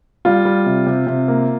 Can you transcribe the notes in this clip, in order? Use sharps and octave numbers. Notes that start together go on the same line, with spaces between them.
G3 F4
G3
C3
C3
C3
A#3